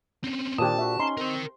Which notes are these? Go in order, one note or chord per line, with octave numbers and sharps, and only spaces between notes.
C4 C#4
A#2 D#3 D4 G4 C5 A5 D#6
F#4 E5
C#4 D#4 C6
C4 A#4 G5